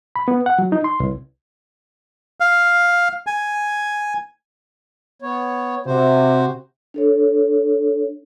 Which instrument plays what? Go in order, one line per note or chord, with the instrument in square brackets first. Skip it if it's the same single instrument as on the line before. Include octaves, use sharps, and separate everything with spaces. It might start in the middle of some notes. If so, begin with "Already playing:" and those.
[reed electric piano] B5
B3
F#5
F#3
D#4
C6
C2
[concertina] F5
G#5
[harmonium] B3 C#5
[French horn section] C3 [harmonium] F#4 C5
[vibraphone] D4 A4 C#5